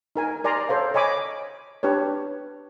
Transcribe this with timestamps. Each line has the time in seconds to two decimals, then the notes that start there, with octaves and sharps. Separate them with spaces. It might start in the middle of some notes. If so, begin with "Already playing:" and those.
0.16 D#4 A#4 G#5
0.44 A#4 D5 G#5 A#5 C6
0.69 A4 C5 C#5 F5
0.94 C#5 D#5 G#5 B5 D6
1.83 D4 G4 B4 C#5